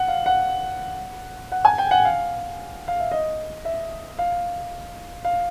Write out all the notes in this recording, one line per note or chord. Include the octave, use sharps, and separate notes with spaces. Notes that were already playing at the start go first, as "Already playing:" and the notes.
Already playing: F#5
F5
F#5
F#5
G#5
G5
F#5
F5
F5
E5
D#5
E5
F5
F5